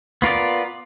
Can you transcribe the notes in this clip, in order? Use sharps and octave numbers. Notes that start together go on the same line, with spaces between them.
B3 F4 A#4 D5